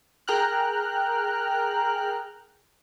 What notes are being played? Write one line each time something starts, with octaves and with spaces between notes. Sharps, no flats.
G#4 A#4 G5 A#5 F6 F#6